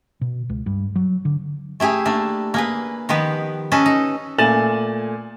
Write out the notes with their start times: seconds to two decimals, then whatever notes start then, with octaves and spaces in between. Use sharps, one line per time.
0.21 B2
0.50 C#2
0.66 G2
0.95 F#3
1.25 D3
1.80 A3 E4 G4 G#4
2.05 A3 A#3 D4
2.54 A#3 G#4 B4
3.09 D#3 F3 B3 G4 B4
3.72 C#4 A4 B4 D#5
3.86 D#4
4.38 A#2 A3 G#5 A6 E7 F#7